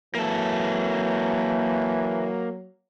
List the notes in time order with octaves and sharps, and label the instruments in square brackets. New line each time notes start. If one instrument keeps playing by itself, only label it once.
[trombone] E3 [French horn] F#3 [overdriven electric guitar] A#3 A4